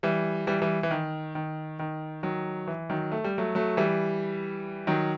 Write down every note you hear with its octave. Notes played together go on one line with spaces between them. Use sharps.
E3 G3
E3 G3
E3 G3
E3
D#3
D#3
D#3
D#3 F#3
E3
D#3 F#3
A3
G3
F#3 A3
F#3 A3
E3 G3
D#3 F#3